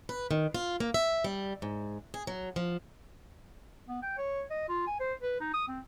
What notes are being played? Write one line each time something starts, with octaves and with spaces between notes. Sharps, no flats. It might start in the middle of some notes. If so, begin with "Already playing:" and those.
B4
D#3
F4
A#3
E5
G3
G#2
G#4
F#3
F3
B3
G5
C#5
D#5
F4
G#5
C5
B4
D#4
D#6
C4